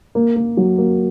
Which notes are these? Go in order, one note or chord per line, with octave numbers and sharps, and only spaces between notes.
A#3
A#3
F#3
A#3